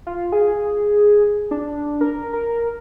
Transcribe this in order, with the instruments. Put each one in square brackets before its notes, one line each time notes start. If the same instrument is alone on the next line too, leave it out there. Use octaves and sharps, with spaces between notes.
[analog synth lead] F4
G#4
D4
A#4
A#4